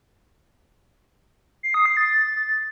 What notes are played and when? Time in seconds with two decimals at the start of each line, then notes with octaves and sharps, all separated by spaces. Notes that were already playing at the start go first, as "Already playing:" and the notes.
1.63 C7
1.74 D#6
1.85 C7
1.97 A6